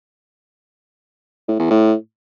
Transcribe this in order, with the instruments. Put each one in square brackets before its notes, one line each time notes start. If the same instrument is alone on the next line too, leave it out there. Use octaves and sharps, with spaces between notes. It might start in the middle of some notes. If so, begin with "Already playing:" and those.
[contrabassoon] A2
E2
A2